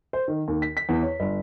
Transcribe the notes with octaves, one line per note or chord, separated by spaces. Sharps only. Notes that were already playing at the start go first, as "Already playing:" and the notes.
C5
D#3
D#2
B6
B6
E2
C#5
G1